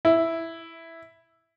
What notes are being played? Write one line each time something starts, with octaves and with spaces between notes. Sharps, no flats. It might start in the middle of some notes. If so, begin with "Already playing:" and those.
E4